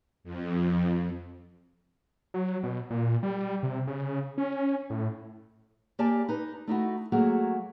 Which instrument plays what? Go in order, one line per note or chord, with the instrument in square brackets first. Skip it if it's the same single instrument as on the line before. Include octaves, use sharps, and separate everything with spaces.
[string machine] F2
[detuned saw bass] F#3
B2
A#2
G3
C3
C#3
C#4
A2
[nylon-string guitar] A#3 G4 D5 G#5 A5
D#4 B4
A3 D#4 E4 F#4
F#3 A3 A#3 F#4 G#4